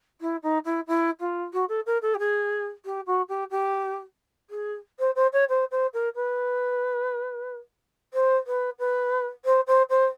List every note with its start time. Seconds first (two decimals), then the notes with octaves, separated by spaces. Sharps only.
0.21 E4
0.42 D#4
0.64 E4
0.87 E4
1.20 F4
1.53 F#4
1.68 A4
1.86 A#4
2.02 A4
2.14 G4
2.19 G#4
2.85 G4
3.06 F#4
3.28 G4
3.50 G4
4.50 G#4
4.99 C5
5.15 C5
5.32 C#5
5.49 C5
5.71 C5
5.93 A#4
6.15 B4
8.13 C5
8.47 B4
8.79 B4
9.45 C5
9.67 C5
9.89 C5